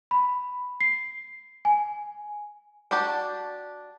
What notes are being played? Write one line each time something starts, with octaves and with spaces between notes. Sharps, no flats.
B5
C7
G#5
D4 F#4 G4 D5 A5